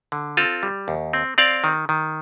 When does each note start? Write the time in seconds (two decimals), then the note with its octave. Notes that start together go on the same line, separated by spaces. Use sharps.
0.12 D3
0.37 C4 F4 A4
0.63 G3
0.88 D#2
1.13 C4
1.38 C4 D5 F5
1.64 D#3
1.89 D#3